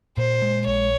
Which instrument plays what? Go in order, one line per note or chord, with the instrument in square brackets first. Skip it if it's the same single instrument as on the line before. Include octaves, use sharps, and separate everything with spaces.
[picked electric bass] A#2 [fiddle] C5
[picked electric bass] G#3
[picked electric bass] A#1 [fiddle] C#5